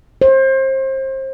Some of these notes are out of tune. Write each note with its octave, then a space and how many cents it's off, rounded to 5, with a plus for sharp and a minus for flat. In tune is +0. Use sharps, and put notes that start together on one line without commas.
C5 +30